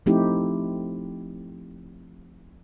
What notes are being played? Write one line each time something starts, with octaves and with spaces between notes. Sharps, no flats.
F3 A3 C4 D#4 E4 G4